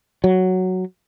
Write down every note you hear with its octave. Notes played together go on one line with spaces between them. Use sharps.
F#3